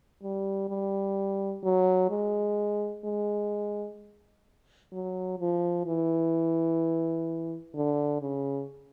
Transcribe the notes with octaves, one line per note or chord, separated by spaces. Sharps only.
G3
G3
F#3
G#3
G#3
F#3
F3
E3
D3
C#3